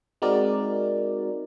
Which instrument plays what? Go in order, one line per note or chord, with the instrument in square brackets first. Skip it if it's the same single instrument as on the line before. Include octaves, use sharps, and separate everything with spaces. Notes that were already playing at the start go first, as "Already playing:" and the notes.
[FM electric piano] G#3 C4 D#4 F#4 A#4 D5